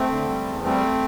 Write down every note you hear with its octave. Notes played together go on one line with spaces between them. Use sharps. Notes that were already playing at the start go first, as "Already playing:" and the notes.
Already playing: A3 C4
D3
G3
E2
G3 A3 C4